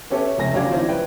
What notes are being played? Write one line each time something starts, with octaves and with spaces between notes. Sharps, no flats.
B3 C#4 G4 A4 C#5 E5
F1 C#2 C3 G#5 A#6
F#2 C#4 D4 G4 F5 G#6
D#3 F3 C4 D4 E4
B4 G5